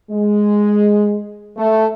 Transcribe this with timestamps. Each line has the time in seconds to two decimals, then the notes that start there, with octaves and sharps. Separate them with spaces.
0.11 G#3
1.57 A3